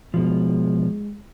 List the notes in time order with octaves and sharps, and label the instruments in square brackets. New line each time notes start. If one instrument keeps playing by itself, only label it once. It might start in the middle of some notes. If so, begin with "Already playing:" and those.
[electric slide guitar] B2 F3 [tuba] G#3